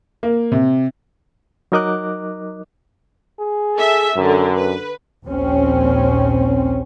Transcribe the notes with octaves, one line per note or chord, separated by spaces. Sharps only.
A#3
C3
F#3 D#4 A#4 D#5 D6 F#6
G#4
A4 E5
F#2 D3
B4
A#1 D#2 C4 C#4